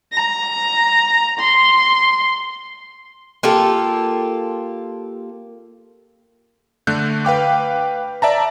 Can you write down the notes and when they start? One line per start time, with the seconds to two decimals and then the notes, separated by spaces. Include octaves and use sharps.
0.14 A#5
1.39 C6
3.43 A#3 F4 G4 A4
6.87 D3 A3 F#6 G6
7.25 B4 F5 G5 D6
8.22 D5 E5 A5 A#5